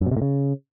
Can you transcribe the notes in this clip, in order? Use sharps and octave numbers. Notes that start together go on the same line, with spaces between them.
F#2
B2
C3
A2
C#3